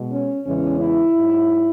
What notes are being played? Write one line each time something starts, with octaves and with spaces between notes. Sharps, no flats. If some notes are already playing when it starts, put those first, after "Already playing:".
Already playing: B2 G#3
C#4
E2 C#3 E3 G#3 C#4
E4
G#2 F#3